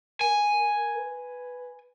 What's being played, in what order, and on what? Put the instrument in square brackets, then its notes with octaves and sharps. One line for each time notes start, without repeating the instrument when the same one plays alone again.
[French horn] A#4 [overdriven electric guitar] G#5
[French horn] B4